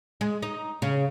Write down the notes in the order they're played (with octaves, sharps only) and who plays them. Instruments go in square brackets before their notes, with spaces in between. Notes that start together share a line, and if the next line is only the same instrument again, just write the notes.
[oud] G#3
D#4
C#3